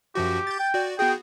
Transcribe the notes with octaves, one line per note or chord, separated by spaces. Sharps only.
F#2 F3 F#4 G4
G6 A6
G5
F#4 D5
B3 F#4 G#4 G5